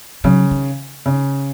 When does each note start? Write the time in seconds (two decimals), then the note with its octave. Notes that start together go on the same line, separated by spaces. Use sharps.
0.24 C#3 F#3
0.51 D#3
1.06 C#3